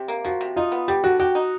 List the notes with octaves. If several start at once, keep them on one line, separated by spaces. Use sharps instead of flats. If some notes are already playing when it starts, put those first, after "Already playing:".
Already playing: C3 G4
A#3
F3 F#4
C3
D#4 F4
B3
G3 G4
D3 F#4
F#4 G4
D#4